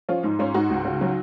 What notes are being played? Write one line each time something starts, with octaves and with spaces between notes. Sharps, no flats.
F3 C#4 F4
G#2 D#4
G#2 C#4 F4
G#2 D#4 F#4
C#2
C#3
F#3